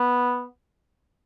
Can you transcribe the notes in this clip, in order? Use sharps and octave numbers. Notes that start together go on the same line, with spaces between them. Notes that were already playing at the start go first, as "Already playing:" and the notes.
Already playing: B3